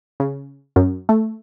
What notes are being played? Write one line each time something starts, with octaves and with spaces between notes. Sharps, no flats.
C#3
F#2
A3